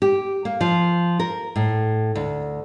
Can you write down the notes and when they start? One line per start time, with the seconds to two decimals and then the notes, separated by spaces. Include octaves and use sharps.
0.02 G4
0.45 A#3
0.61 F3
1.19 A#4
1.56 A2
2.16 D2